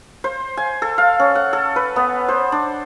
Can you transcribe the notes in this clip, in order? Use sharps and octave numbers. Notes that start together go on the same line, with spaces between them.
C5
G#5
A4
F5
C#4
F#5
A4
B4
B3
C5
D4